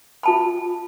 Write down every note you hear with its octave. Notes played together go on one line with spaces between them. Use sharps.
F4 A5 B5